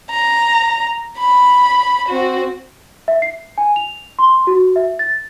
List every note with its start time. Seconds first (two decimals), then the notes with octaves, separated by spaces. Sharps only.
0.10 A#5
1.18 B5
2.08 C4 F#4
3.08 E5
3.22 C7
3.58 G#5
3.76 F7
4.19 C6
4.47 F#4
4.76 E5
4.99 A6